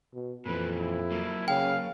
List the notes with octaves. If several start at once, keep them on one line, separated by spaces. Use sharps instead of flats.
B2
F2 A#2 E3 B4
E4
F#3 A#3
C#3 F5 G5